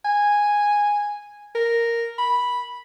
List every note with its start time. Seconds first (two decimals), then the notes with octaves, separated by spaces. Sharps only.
0.05 G#5
1.55 A#4
2.18 B5